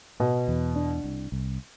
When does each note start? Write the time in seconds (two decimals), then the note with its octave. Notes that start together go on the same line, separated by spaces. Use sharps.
0.20 B2 B3
0.48 E2
0.76 D4
1.04 C2
1.32 C2